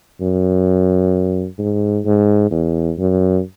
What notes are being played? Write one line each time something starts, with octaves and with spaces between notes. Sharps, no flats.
F#2
G#2
G#2
E2
F#2